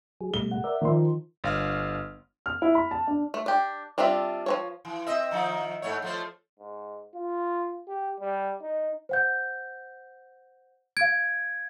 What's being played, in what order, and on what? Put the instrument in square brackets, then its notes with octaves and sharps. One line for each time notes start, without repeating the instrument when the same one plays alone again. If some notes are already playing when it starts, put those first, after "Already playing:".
[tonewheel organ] F#3 G#4
[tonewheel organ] B2 G3 A3 [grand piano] G7
[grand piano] F#5
[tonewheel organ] A#4 D5 E5
[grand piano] D#3 F3 C6
[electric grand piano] G1 F5 F6
[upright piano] F6
E4
B5
A5
D4
[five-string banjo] A3
D4 G4
G3 C4 D4 F4 E5
F3 C4 C#5
[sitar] E3
C4 D#5 E5
D#3 F3 D#4
G#2 A3 C#5
F3 A3 C5
[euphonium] G#2
F4
G4
G3
D#4
[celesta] C5 F#5 G6
[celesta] F5 D7 [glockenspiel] G#6